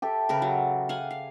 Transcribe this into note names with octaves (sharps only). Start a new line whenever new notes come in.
G4 A4 E5
C#3 A#4 B4
F#3
F5 F#5 G#5
F5